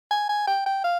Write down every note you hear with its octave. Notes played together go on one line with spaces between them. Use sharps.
G#5
G#5
G5
G5
F5